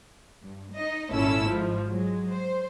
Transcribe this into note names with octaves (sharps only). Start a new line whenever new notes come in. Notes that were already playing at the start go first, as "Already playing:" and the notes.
G2
D#4 D#5
G#1 A#2 C#4 E4 A4 E6
G#2 F3
F#3 G#3
C5